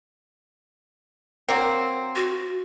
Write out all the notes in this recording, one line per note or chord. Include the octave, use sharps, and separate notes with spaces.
F#3 A#3 C4
F#4